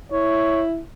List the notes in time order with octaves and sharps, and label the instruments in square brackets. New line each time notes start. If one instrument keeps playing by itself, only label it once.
[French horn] E4 [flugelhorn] C#5